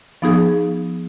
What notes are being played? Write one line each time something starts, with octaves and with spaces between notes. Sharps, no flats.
F3 B3 D#4 G#4